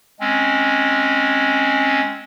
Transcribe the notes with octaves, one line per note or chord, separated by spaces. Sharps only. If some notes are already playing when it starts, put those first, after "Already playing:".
G#3 C4 C#4